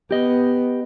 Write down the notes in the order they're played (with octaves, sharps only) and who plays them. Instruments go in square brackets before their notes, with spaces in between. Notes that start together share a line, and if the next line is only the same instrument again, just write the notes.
[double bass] B3 [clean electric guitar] G4 D#5